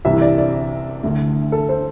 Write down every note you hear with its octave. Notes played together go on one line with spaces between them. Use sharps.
C2 C3 E3 E5
D5
D5
D2 D3
A4
C5